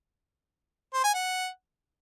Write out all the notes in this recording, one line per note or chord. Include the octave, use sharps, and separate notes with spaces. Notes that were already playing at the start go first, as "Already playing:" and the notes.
C5
G#5
F#5